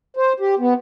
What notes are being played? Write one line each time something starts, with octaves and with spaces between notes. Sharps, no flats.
C5
G4
B3